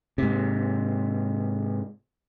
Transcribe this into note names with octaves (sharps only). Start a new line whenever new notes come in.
G#2 C3